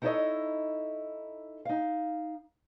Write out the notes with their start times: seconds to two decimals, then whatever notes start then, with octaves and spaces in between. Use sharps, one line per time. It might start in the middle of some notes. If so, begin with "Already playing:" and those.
0.02 D#4 E4 A4 B4 C#5 D#5
1.65 D#4 F5